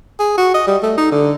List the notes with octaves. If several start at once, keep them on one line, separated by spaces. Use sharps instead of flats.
G#4
F#4
D#5
G3
A3
D#4
D3